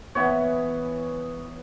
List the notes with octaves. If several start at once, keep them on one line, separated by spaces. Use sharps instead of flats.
E3 B3 C#5